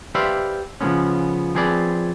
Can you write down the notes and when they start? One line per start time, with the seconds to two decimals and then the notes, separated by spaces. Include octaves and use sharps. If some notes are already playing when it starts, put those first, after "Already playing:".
0.15 G4 B4 C5 D5 E5 F5
0.81 C#3 F3 G#3 A3 B3 C#4
1.55 F3 C4 G#4 B4 D5